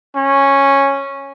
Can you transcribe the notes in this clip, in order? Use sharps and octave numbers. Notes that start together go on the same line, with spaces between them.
C#4